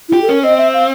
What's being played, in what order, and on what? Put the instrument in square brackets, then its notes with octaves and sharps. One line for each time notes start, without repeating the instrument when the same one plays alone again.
[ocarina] E4
[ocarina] F4 [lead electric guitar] G4
[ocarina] A4
[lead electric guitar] C#4 [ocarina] A#4
[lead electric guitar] C4 [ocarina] D#5
[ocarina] E5
F5